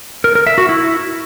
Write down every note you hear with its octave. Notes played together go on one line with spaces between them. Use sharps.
A#4
A#4
E5
F#4
E4